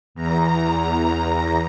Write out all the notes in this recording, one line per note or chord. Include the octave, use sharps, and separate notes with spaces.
E2 A#5